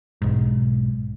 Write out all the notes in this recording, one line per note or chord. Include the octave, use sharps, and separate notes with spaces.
B1 G#2